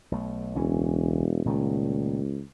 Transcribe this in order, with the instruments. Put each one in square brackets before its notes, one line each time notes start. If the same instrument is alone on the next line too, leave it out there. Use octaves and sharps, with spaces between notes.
[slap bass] B1 A3
[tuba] E1 [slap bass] C#2 E3 C#4
[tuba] C#2 [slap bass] A#2 D#3 A3